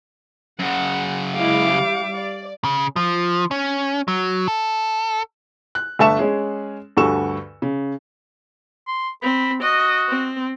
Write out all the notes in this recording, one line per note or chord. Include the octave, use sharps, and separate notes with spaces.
F#2 C#3 F#5
G#3 E4 F5 D6
G3
D5
C#3
F3
C#4
F#3
A4
F#6
G1 A3 E5 A5 C#6 E7
G#3 C#4 G#4
D2 G2 F#4 A4 C#6 E7
C#3
C6
C4 B5
F#4 D#5
C4